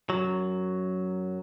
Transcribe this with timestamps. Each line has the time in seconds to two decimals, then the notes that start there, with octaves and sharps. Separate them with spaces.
0.10 F#2 F#3